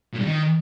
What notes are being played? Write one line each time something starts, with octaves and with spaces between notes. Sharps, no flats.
A#2
G2
D#3